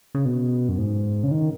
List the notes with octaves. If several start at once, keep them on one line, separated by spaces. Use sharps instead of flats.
C#3
B2
F#2
G#2
C#3
D#3